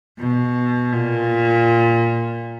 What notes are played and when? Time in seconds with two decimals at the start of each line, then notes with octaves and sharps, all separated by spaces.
0.19 B2
0.92 A#2